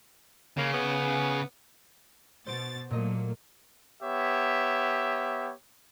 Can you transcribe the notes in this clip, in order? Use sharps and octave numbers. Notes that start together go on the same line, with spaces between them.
C#3 A#3
B3
B2 C5 A6 D7
A#2 F#3 A3 A#3 D#5
B3 G4 C#5 E5